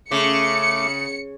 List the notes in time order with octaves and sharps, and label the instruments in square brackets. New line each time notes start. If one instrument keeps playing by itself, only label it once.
[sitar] C#3 [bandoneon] A3 D6 [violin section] C#7